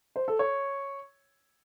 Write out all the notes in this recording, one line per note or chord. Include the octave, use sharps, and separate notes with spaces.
C5
A4
C#5